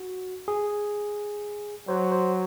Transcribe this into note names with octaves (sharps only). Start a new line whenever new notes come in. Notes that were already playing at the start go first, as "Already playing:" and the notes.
Already playing: F#4
G#4
F#3 C5
C5